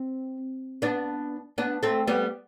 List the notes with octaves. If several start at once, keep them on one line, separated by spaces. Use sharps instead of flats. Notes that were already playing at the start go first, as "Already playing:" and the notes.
Already playing: C4
B3 D4
B3 D4
A3 C4
G3 B3